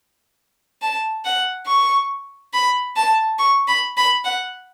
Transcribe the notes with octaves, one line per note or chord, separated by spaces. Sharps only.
A5
F#5
C#6
B5
A5
C#6
B5
B5
F#5